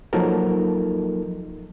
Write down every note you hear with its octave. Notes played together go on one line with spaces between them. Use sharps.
F3 F#3 A#3 D#4 A4 A#4